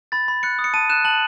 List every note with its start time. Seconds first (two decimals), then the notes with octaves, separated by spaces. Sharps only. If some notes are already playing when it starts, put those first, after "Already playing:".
0.12 B5 A6
0.28 B5
0.43 F#6 C#7
0.59 D#6
0.64 C#7
0.74 A5 D#7
0.90 F#6 E7
1.05 A5 F#7